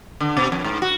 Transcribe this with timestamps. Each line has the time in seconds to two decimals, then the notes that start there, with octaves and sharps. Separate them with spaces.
0.20 D3
0.37 B2
0.52 F2
0.64 G#2
0.82 F#4